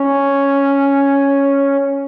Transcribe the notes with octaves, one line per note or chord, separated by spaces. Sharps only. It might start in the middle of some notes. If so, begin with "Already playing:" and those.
Already playing: C#4